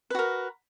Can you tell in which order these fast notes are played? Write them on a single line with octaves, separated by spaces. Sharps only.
B4 F#4 A#4